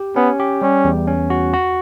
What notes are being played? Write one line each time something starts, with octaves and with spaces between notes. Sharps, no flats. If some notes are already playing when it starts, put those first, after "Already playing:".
Already playing: G4
B3 C#4
G4
G3 C#4
E2
C#4
F#4
F#4